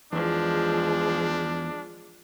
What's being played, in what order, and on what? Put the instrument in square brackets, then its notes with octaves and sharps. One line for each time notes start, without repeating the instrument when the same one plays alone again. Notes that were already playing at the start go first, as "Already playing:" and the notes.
[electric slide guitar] E2 [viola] F3 G#3 [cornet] D4